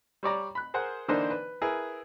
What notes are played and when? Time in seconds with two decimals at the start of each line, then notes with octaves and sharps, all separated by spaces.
0.23 G3 C#5 D5 A#5
0.55 B5 F#6
0.74 G#4 A#4 C5 F#5
1.08 D3 E3 A#3 D4 D#4 C5
1.30 B4
1.61 E4 G#4 A#4 B4